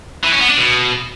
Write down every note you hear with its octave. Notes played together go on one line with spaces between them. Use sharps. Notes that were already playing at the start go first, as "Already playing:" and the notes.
E3
C#4
B3
D4
B2